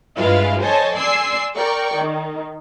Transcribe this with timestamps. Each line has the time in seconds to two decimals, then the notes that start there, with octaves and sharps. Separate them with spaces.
0.18 G2 G#3 E4 F4 B4 F5
0.61 A4 C5 C#5 D#5 G#5 A5
0.95 D5 G#5 C6 E6 C7
1.57 A#4 D5 G5 C#6
1.95 D#3